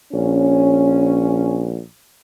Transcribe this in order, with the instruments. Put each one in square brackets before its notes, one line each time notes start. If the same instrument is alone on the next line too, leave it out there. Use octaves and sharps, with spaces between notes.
[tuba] A#1 [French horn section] C#4